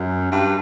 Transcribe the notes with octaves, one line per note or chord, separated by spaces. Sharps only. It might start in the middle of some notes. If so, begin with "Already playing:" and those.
Already playing: F#2
G2